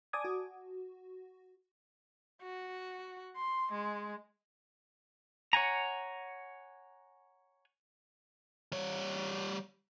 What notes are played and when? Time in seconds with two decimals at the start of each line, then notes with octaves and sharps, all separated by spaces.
0.13 D5 G#5 A5 D6 D#6 G#6
0.25 F#4
2.42 F#4
3.36 C6
3.72 G#3
5.53 C#5 F#5 G#5 A#5
8.72 G3 C#5